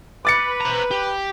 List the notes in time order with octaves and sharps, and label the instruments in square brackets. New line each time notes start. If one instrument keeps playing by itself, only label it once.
[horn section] B4 [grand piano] D6 A6 C#7
[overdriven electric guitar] C5 A#5
G4